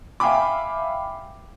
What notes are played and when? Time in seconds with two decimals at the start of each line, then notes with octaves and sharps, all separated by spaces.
0.20 E5 F5 G5 G#5 B5 D6